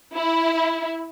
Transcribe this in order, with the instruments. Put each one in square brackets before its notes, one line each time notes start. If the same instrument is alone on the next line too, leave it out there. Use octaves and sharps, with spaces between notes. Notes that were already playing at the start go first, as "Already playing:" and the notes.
[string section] E4